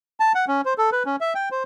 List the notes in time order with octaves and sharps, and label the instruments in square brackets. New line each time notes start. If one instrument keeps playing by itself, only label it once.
[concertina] A5
F#5
C#4
C5
A4
B4
C#4
E5
G5
C5